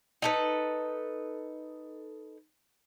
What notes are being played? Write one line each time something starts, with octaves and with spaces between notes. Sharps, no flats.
D#4 A4 B4